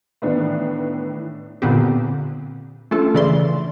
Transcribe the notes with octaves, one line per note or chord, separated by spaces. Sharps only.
A2 D#3 E3 B3 D4
A#2 D3 B3 C4 G4
A3 C#4 D4 F4 A4
C#3 E3 D5 E5 C6